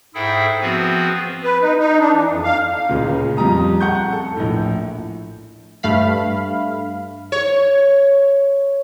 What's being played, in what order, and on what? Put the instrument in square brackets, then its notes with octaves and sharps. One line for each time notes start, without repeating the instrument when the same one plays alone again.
[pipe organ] G#2 E4 G#4 A4 E5 G5
F3 B3 C4 F#4 G#4 B4
[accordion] B4
D#4
D#4
D4
E3
F2
F5
[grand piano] C#2 A#2 C#3
F2 G3 A#5 D#6
F#5 C#6 G6
A4
A#1 A2
[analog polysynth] G2 A3 F5 B5
[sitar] C#5